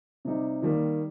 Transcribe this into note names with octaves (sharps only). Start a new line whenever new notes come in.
C3 G3 D#4
D#3 G3 A#3